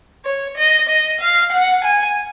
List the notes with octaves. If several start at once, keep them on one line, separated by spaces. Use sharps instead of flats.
C#5
D#5
D#5
F5
F#5
G#5